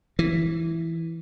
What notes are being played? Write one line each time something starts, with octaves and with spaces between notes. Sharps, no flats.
E3